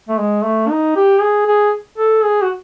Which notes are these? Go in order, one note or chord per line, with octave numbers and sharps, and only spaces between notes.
A3
G#3
A3
D#4
G4
G#4
G#4
A4
G#4
F#4